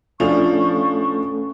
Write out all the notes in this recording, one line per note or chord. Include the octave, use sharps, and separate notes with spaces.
F3 A3 C#4 D4 A4 C#6 F7